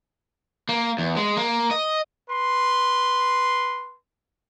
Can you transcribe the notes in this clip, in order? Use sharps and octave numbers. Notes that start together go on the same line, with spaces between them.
A#3
E2
G#3
A#3
D#5
B4 C6